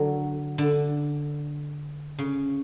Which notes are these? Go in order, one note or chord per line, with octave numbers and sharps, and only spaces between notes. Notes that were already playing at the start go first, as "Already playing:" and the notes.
Already playing: D3 F#3
D3
C#3